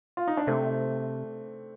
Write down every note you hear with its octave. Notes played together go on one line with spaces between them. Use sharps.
F4
D#4
D4
C3 A3 C4